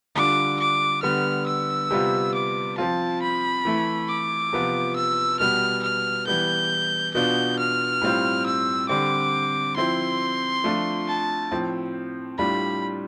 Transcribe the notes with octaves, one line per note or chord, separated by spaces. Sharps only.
D3 G3 D4 F4 D6
D6
D3 G3 B3 F6
E6
C3 G3 B3 F4
D6
F3 C4 F4 A5
B5
E3 A3 E4
D6
C3 F3 B3 F4
E6
B2 G3 B3 F6
F6
E3 G3 B3 G6
B2 B3 D4 F4 G6
F6
A2 G3 C4 F4
E6
D3 G3 C4 D6
F3 C4 E4 C6
F3 A3 D4 F4
A5
A2 F3 C4
A2 G3 D4 F4 B5